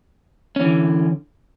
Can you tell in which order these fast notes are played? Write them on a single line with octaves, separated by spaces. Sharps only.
C#4 E3 D3